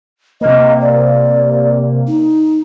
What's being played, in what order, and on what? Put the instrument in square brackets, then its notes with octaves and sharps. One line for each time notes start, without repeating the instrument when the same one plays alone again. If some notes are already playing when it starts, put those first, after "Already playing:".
[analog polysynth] C3 A#3 [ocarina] D#5
[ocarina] D5
D#4